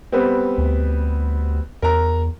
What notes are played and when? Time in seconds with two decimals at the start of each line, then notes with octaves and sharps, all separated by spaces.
0.12 G3 B3 C4
0.58 D2
1.82 E2 A#4 A#5